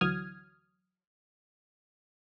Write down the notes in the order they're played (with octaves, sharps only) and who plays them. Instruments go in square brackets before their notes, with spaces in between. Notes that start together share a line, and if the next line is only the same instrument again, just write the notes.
[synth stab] D2 E3 F#3 D#6 F6 G#6